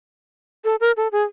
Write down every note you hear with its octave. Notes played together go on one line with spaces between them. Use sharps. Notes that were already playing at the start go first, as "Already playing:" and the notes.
A4
A#4
A4
G#4